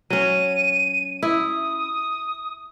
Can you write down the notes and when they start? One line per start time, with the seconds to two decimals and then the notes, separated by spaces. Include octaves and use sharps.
0.10 F#3 C#4 D#7
1.23 E4 D#6